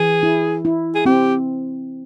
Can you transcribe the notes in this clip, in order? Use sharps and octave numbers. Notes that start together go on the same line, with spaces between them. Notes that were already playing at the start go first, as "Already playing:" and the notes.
Already playing: E3 G#4
E4
E4
G#4
C4 G4